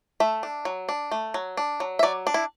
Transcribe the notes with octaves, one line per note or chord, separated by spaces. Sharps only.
A3 E5
D4
F#3
D4
A3
F#3
D4
F#3
E5
F#3 D5
D4
E4